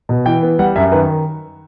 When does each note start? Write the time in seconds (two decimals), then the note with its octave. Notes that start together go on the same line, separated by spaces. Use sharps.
0.09 B2
0.26 E3 G5
0.43 B3
0.59 G3 F#5
0.76 F#2 E5
0.92 D#3 B4